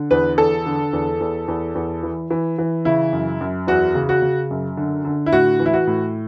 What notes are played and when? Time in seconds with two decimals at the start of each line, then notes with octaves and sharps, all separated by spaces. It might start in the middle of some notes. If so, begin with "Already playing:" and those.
Already playing: D3
0.11 E2 B4
0.38 E2 A4
0.66 D3
0.93 E2
1.21 E2
1.48 E2
1.75 E2
2.03 E3
2.30 E3
2.58 E3
2.85 C#3 E4
3.13 F#2
3.41 F#2
3.67 E2 F#4
3.95 C#3
4.09 F#4
4.22 C#3
4.51 F#2
4.77 D3
5.05 D3
5.26 E4
5.33 A2 F#4
5.59 E3
5.66 E4
5.73 F#4
5.87 A2